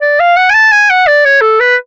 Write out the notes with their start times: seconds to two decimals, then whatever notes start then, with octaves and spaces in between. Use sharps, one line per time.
0.02 D5
0.20 F5
0.37 F#5
0.50 G#5
0.54 A5
0.72 G#5
0.90 F#5
1.07 D5
1.25 C#5
1.42 A4
1.60 B4